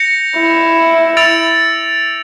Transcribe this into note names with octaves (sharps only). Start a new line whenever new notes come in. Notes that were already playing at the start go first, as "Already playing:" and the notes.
Already playing: G6 A#6 C#7 F7
E4
E6 A6 D7 F7